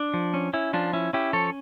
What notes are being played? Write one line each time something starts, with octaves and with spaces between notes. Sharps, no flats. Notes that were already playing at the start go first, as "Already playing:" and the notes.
Already playing: D4
F3
C#4
C#4 E4
F3 D4 F4
C#4 E4
C#4 E4 G4
F3 A4 C#5